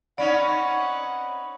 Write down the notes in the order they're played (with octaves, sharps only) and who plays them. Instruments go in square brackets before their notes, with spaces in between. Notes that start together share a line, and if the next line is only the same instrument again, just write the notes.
[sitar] C4 C#4 D#4 [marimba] D5 [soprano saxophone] F#5 [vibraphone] B5